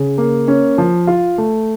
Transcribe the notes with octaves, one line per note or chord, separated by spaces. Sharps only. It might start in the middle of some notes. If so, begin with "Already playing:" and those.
Already playing: C#3
A#3
C#4
F3
F4
A3